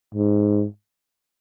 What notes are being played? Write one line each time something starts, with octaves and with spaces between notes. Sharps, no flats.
G#2